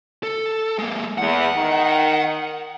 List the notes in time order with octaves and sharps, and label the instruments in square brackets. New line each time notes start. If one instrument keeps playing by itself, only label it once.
[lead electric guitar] A4
G#3 A#3
[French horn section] E2 [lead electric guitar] F#5
[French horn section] D#3